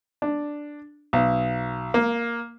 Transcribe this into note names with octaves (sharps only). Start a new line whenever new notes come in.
D4
B1
A#3